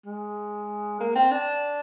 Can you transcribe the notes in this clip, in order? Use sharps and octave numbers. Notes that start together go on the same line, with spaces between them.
G#3
A#3
C4
D4